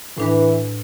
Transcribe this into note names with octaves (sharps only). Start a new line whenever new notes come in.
A2 E3 D4 B4